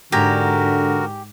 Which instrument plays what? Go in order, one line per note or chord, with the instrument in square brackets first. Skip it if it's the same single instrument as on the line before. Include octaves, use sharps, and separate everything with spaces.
[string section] G#2 [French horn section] D3 [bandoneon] F#4 A#4 [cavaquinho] G4 G#5 A#5